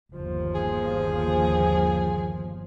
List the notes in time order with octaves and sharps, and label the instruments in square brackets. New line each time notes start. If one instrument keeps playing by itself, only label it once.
[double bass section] G1 D#2 F3
[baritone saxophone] G#4